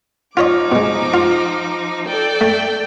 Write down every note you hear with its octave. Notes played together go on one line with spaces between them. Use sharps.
F3 D#4 F4 C#5 D#5 D6
B2 G#3
F4
A4 D5 G5
A3